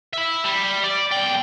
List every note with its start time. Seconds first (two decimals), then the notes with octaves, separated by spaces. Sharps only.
0.13 E5 B5
0.44 G3
0.84 D5
1.12 B1 G5